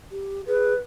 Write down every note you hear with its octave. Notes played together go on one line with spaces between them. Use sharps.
G4
G#4 B4